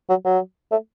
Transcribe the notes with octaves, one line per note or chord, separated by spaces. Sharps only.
F#3
F#3
A3